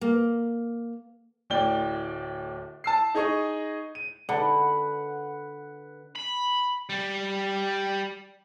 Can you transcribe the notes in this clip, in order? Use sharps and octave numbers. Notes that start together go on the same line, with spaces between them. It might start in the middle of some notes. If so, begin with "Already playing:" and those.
A#3
D1 A2 D5 G5 G7
A5 E6 C7
D#4 G#4 D#5 C#6
D#7
D3 B4 F#5
B5
G3